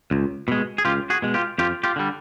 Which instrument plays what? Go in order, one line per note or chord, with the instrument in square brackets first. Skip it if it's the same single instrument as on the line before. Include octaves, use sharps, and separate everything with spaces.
[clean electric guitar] C#2
B2 G#3
G#4
C#2 F4 G4
F#4 G#4
B2 G#3
F4 G4
F2 F4 G4
F4 G4
D3 G3